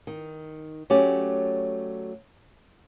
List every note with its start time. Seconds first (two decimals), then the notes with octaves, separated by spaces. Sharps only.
0.07 D#3
0.90 F#3 A3 C#4 G4 D5